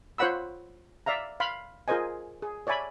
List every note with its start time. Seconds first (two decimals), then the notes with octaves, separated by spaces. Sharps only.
0.18 F4 C5 C#5 F#5 B5 E6
1.06 D5 E5 F5 A#5
1.40 F5 B5 C6
1.88 F4 G#4 A#4 C5 D#5 G#5
2.42 G#4
2.67 C#5 D5 E5 G#5 B5